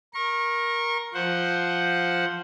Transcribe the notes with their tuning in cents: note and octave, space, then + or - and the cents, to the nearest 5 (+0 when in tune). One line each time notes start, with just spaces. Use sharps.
A#4 +10 C#6 -30
F3 +0 C5 +0 F#5 +0